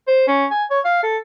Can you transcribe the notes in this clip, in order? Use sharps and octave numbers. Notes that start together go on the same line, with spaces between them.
C5
C#4
G#5
C#5
F5
A4